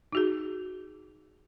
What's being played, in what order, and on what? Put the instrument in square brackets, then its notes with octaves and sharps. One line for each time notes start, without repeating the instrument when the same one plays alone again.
[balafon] D#4 F#4 G#4